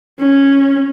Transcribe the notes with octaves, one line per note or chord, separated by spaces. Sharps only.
C#4